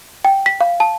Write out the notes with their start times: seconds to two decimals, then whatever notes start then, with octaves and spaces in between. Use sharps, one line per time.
0.25 G5
0.46 B6
0.61 F5
0.80 A5